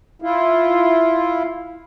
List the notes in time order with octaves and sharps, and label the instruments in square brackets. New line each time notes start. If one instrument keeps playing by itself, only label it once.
[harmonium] E4 F4